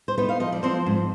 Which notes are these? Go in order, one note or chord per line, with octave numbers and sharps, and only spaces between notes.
C5
B3 D#4 B4
F5
F3 D#5
D5
F3 C4 C5
G#2